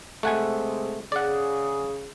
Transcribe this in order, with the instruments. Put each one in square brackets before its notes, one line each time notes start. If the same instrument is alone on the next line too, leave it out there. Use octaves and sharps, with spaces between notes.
[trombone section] C3 G#3 [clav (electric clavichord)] A3 F#5 G#5
[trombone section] C#3 G#4 [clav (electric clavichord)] D5 F#5